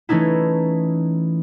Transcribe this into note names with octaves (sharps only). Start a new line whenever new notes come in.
E3 A3 C#4 D#4 E4